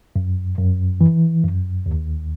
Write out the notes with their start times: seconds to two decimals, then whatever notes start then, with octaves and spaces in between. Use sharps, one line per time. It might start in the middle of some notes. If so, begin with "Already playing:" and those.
0.16 F#2
0.58 F#2
1.01 E3
1.44 F#2
1.86 D#2